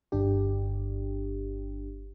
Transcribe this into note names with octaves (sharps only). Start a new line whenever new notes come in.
G1 D4 G4